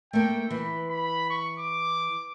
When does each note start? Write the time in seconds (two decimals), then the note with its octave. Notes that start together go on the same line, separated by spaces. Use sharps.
0.13 A3 A#3 G5
0.50 E3 B5
0.89 B5
1.30 C#6
1.59 D6